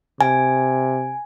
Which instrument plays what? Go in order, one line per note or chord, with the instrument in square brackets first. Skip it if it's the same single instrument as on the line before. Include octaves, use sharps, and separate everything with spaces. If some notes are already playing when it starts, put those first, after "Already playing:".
[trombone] C3 [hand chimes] G#5